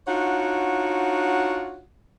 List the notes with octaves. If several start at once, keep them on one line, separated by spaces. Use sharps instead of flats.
D4 D#4 F4 F#4 C#5 F#5